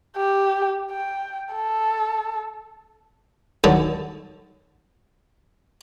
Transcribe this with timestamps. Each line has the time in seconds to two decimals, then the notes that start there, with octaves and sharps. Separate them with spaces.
0.17 G4
0.91 G5
1.54 A4
3.64 D#2 D3 F#3 A5